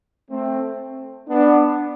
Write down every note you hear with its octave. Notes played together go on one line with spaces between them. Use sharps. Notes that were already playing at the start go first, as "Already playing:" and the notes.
A3 C4
B3 D4